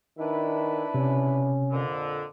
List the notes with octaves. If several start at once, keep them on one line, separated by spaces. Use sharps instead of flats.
D#3 D4 E4 B4
C3 C#4
F2 A#2 D3